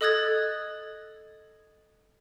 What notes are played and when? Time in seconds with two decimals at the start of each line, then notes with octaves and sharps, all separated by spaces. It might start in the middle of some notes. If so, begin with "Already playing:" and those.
0.01 A4 D#5 D#6 F#6 G#6 A6